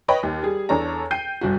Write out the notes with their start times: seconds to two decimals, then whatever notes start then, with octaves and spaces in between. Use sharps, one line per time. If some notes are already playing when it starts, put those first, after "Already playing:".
0.08 B4 C#5 D#5 G5 B5
0.23 D#2
0.43 G3 G#4
0.69 E2 D4 A4 C#5 A#5
1.11 G5 G6 C7 D#7
1.41 G1 C2 F#4